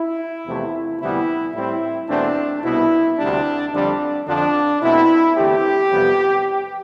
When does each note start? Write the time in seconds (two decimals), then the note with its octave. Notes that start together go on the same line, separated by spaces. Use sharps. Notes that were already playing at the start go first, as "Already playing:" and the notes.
Already playing: E4
0.45 E2 C3 F3 A3
1.00 D2 C3 E3 G3 B3 E4
1.54 A2 G3 C4 E4
2.09 E2 B2 A3 C4 D4
2.63 C2 B2 B3 E4
3.18 D2 C3 G3 D4
3.72 F2 D3 G3 C4 D4
4.27 F2 D3 F3 D4
4.82 B2 A3 C4 E4
5.36 E2 D3 A3 C4 G4
5.91 F2 C3 E3 G3 B3